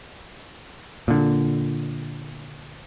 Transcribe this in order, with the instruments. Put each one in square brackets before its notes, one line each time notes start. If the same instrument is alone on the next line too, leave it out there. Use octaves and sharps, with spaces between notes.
[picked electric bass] A#2 D3